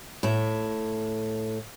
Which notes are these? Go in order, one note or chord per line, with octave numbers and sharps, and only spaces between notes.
A2 E5